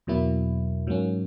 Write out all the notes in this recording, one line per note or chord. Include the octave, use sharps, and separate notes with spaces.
E2 B2 F#3 A#3 E4
G#2 F#3 A#3 C#4